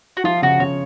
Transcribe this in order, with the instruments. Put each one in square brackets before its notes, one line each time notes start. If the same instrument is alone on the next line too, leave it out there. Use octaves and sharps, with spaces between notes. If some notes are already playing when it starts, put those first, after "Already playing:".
[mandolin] F#4
[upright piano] F3 [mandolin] F4
[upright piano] C#3 [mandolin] F#4
[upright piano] C#3 [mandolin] C#5